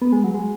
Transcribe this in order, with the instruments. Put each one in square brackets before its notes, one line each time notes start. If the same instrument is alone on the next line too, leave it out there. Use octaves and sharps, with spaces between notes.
[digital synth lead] B3
G#3
F#3
G#3